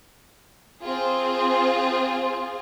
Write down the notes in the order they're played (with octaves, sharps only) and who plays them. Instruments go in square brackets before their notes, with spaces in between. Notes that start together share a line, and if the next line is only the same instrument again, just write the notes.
[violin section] C4 F4 G#4